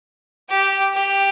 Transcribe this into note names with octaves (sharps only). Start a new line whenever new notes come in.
G4
G4